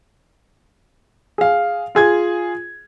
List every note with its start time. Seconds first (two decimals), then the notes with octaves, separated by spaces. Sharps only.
1.38 G#4 F5
1.95 F4 G#4 G#6